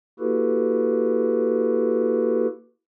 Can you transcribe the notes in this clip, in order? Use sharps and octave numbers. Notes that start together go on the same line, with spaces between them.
A#3 E4 F#4 G4 A4 B4